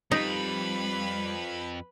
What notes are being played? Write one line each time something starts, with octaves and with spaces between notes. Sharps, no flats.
F2 G3 D#4 B4 B5